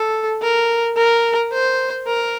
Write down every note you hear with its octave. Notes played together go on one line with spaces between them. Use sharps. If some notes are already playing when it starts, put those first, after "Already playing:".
Already playing: A4
A#4
A#4
C5
A#4